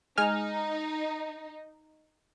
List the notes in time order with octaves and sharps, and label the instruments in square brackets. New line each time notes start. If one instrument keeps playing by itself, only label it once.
[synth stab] G#3 G#5 F6 [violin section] D#4